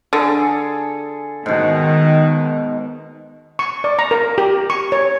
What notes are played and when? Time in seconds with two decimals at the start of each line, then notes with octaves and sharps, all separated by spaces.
0.13 D3 G#4 A4
1.46 G#2 B2 D#3
3.59 C#6
3.84 D5
3.99 A#5
4.11 A#4
4.38 G4
4.70 C#6
4.92 C#5